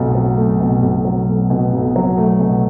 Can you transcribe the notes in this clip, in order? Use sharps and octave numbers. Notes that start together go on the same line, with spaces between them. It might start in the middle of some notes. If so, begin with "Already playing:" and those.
Already playing: B1 B2 A3
F#3
A3
B2
B1
F#3
A3
B2
B1
F#3
A3
B2